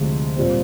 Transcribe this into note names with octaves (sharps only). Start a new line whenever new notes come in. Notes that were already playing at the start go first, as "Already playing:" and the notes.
Already playing: D2 C3 F3 G#3
A#2 G3 C4